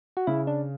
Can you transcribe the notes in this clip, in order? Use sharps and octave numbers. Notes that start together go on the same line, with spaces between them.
F#4
C#3 E4
D4